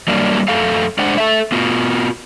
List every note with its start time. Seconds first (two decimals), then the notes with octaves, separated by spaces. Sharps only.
0.08 F#3 G3 A#3 D4
0.48 F#2 A3 A4 F5
0.98 G#3 D4 C5 F#5
1.18 A4 E5
1.52 B3 F4 F#4